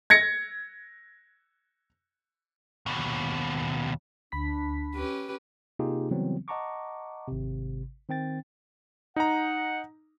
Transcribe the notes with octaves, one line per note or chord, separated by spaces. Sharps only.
G#6 A#6 C#7
D#2 B2
D2 D4 B5 B6
C#4 G4 B4
C3 A#3 D#4 F4 G4 G#4
C#3 E3 F#3 G3 B3 C4
D#5 F#5 A5 A#5 C#6 D6
G#1 C3
D#3 C4 G5 A6
D#4 F#5 A#5